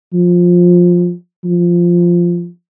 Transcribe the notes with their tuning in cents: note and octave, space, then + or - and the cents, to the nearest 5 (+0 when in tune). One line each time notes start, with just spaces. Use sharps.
F3 +15
F3 -5